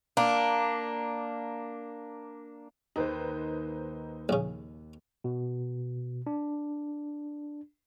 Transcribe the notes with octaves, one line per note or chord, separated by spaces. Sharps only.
A#3 D4
D#2 D#4 B4 C5
A#1 C#3
B2
D4